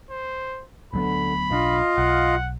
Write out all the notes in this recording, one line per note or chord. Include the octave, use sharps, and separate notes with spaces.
C5
D2 D3 F#3 B3 B5
B1 D4 F4 D#5 F5
B1 F#5